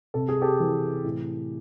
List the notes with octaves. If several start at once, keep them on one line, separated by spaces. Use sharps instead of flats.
C3 A4
G#4
G4 A4
E3
A2